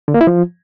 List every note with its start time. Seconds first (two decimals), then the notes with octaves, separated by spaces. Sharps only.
0.08 D3
0.14 A#3
0.21 E4
0.27 F3